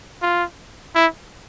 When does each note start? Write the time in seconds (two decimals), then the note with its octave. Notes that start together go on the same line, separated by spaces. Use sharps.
0.22 F4
0.95 E4